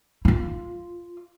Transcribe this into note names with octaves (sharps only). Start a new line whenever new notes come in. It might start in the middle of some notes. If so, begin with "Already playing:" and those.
E4 F4